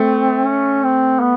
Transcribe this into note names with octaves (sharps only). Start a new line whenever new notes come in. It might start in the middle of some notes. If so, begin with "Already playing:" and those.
Already playing: A3 C4
C#4
C4
B3